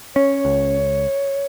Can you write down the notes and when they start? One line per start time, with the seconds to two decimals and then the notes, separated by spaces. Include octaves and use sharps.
0.15 C#4 C#5
0.45 C#2